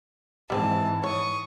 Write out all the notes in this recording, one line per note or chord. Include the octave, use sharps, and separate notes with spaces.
G#2 E3 G3 C4 G#4 A5
C#5 C#6 D#6